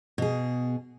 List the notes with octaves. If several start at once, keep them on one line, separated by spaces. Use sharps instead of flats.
B2 G#4